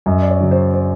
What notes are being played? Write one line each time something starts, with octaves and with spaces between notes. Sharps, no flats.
F#2 D#5
D5
C#5
C#3 F#3
C5
C5